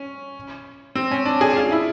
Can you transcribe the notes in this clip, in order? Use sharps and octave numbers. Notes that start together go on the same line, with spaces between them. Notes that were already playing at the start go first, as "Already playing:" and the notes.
Already playing: C#4
C4
C#4
D4
G#4
F4
E4